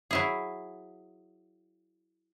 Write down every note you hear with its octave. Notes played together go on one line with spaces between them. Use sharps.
F#3 E4 G#4